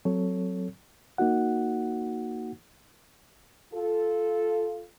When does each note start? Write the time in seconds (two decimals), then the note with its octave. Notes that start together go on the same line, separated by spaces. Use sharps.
0.05 F#3 C4 A4 C#5
1.18 A#3 D#4 F#4 F#5
3.73 F4 A4